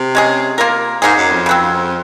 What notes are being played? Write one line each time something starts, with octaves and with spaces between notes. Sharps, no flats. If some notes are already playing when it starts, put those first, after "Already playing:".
Already playing: C3
G#3 C#4 G#4
A#3 F4 A#4
G#2 A#3 D#4 G#4
F#2
F2
C#3 F#3 C4